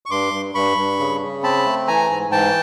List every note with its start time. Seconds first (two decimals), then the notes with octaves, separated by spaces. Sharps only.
0.06 C#6
0.10 G2 C6 D6
0.33 G2
0.55 G2 B5 C#6
0.77 G2
0.99 C#3
1.21 C#3
1.43 C4 A5 B5
1.66 A3
1.87 E3 G#5 A#5
2.10 G#2
2.32 E3 G5 A5